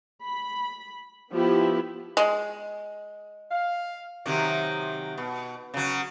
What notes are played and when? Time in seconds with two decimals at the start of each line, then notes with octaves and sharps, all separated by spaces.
0.24 B5
1.32 F3 B3 E4 G4
2.17 G#3
3.50 F5
4.26 C3 D#3 F#3
5.18 B2
5.74 C#3 F#3